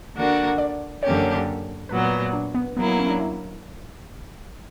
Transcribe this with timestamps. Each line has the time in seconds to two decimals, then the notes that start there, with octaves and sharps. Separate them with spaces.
0.15 D3 A#3 D4 F#4 A#4
0.58 D5
1.02 F#2 D3 A#3 C#4 G4 C#5
1.89 A#2 F#3 B3 B4
2.33 D4
2.54 B3
2.76 F#3 A#3 B3 E4
2.88 B3
2.99 C#4
3.09 D4
3.20 E4